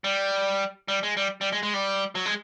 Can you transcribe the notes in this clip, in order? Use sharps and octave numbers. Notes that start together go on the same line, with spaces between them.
G3
G3
G#3
G3
G3
G#3
G#3
G3
F#3
G#3